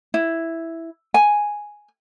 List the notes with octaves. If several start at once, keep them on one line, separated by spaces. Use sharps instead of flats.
E4
G#5